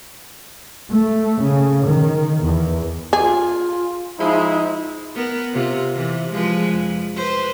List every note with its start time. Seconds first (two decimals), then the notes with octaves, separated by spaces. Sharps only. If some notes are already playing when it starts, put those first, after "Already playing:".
0.92 A3
1.42 C#3
1.87 D#3
2.43 E2
3.13 F4 G#4
4.19 F3 G#3 D#4 E4
5.15 B3 A#4
5.53 C3 F4
5.94 C3 E3
6.32 F3 G#3 B4
6.73 F2
7.16 B4 C5